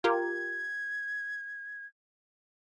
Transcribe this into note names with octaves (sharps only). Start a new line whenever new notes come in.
F4 G4 A#4 G#6